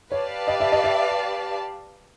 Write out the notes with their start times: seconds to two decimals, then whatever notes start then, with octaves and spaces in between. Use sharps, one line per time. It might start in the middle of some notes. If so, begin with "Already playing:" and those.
0.12 G4 B4 C#5 D5 F5 A5
0.48 D#5
0.60 E5
0.72 D#5
0.84 E5